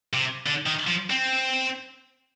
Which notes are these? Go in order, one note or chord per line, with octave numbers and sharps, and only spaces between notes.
C3
D3
D#3
F3
C4